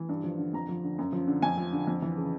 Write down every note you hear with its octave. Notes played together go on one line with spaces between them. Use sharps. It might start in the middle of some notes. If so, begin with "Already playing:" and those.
Already playing: E3
G2
F3
D3
F2 A#5
F3
D3
F#2
F3
D3
F2 G#5
F3
D3
F2
E3
C#3